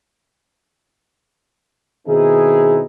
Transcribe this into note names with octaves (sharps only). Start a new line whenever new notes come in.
B2 D#3 C4 D#4 E4 G#4